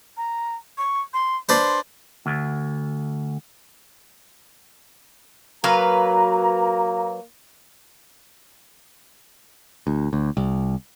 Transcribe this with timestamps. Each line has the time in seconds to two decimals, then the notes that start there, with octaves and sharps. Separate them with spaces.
0.17 A#5
0.78 C#6
1.14 C6
1.49 D4 B4 C5 C6
2.26 D2
5.64 F#3 A#3 B4 F5 A#5
9.87 D2
10.13 D2
10.37 C2